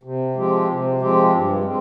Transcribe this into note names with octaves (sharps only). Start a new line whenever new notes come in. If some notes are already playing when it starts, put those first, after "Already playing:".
C3
F3 G#3 C4 G4
C3
F3 G#3 C4 G4
G2
G#3 C4